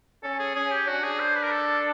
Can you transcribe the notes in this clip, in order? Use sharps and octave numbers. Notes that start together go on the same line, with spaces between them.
C#4 A4
G#4
C#4 G#4
G4
D4 F#4
G#4
C5
B4
A#4
A4